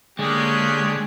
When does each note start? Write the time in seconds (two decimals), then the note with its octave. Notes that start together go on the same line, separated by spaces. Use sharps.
0.19 D3 G#3 A#3 C#4 G4 G#4 C#6 F#6